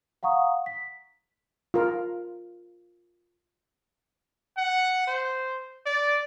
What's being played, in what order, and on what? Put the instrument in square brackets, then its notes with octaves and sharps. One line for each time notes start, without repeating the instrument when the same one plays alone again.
[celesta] F5 F#5 A#5 C#6 D#6
B6
[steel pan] F4 A#4
[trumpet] F#5
C5
D5